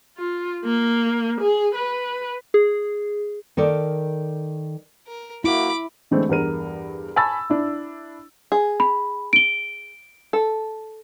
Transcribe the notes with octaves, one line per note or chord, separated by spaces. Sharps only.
F4
A#3
G#4
B4
G#4
D#3 A4 A#4 D5
A#4
F#3 A#3 E4 B5 D6
D3 E3 G#3 A3 C4 D4
E2 G2 A#4 D#7
G#5 A5 B5 C#6 E6 A6
D4 E4
G#4
B5
D7 G7
A4